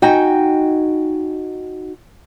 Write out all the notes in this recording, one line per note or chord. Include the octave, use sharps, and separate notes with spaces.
D#4 F#4 G5 G#5